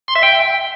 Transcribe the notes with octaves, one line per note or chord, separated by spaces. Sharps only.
C6
E5
G5